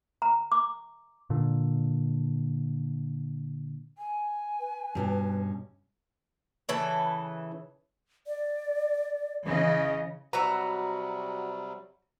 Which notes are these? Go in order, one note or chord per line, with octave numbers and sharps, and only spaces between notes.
A#5
D6
A#2 D3
G#5
B4
G2 B2 C#4
C#3 E3 A4
D5
C#3 E3 D#5
C3 F#3 G3 F#4 B4 A#5 E6